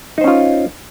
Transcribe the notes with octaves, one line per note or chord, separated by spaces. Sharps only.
C#4 D#4 F4 C5